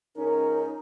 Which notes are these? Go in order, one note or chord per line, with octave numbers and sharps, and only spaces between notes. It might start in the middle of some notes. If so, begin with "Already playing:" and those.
C#2 C#4 D#4 A#4